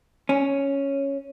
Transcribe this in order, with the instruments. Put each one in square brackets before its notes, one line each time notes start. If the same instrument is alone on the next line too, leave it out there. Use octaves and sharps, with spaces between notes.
[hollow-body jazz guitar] C#4